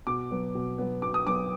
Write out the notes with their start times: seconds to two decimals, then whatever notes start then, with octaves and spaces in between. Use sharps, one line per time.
0.07 B2 D6
0.31 F#3 B3
0.55 B2
0.78 F#3 B3
1.02 B2 D6
1.14 D#6
1.27 F#3 B3 D6